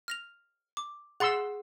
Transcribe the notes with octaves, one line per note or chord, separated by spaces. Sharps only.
F6 A#6 F7
D6
G#4 F#5 C6 E6 A6